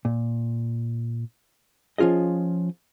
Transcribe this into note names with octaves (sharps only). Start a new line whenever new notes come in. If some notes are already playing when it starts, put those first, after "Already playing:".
A#2
F3 C#4 F4 G#4 D#5